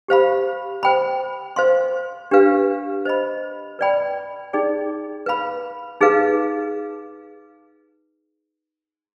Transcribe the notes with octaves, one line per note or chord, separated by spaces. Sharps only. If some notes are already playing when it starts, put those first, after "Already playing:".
G4 C5 F5 B5
C5 G5 B5
C5 F5 C6
D4 G4 B4 F5
C5 D#5 B5
B4 D5 G5 B5
D#4 G#4 D5 G5
B4 F5 B5
D#4 G#4 B4 F5